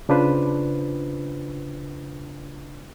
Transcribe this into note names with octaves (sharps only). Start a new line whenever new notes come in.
C#3 D4 F4 B4 C5